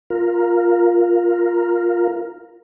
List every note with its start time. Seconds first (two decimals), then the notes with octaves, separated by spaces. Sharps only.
0.10 F4 A#4